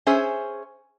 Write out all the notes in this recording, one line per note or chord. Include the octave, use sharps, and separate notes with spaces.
C#4 G#4 C5 E5